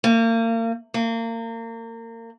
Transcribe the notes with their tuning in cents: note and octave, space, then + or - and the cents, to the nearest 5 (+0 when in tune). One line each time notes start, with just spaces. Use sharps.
A#3 -35
A#3 -30